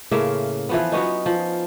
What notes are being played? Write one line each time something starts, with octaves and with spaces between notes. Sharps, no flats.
A2 C#3 A#3 E5
E3 F3 B3
F#3 B3 C#4 D#4
F3